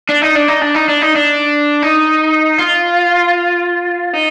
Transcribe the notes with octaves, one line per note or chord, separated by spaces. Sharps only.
D4
D#4
D4
D#4
D4
D#4
D4
D#4
D4
D#4
F4
D#4